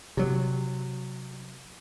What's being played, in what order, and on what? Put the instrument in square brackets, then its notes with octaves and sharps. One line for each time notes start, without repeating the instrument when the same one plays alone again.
[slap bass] C3 F#3